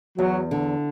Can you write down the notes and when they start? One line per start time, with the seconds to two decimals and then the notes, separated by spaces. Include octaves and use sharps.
0.18 E2 F#3
0.51 D3